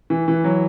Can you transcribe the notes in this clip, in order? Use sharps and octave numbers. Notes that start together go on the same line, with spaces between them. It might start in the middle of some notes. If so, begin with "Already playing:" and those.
E3
E3
F#3